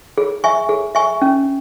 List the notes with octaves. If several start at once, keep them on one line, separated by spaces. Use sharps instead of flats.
G#4
E5 G#5 C#6
G#4
E5 G#5 C#6
C#4